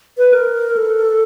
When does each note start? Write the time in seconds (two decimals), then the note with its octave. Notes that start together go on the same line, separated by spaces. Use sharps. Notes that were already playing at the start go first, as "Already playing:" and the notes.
0.18 B4
0.33 A#4
0.77 A4